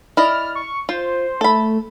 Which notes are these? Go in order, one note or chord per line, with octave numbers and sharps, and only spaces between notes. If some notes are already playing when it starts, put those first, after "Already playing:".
E4 D5 D#5 F6
C#6
F4 C5
A3 A4 B5